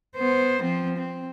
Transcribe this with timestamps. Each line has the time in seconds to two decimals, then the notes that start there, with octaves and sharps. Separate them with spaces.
0.17 B3 C5
0.63 F3 C4
0.98 C4